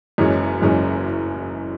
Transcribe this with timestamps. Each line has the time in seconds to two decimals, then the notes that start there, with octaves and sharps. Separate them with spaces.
0.18 F#1 F#2 E3 G#3 C#4
0.62 F#1 F#2 E3 G#3 C#4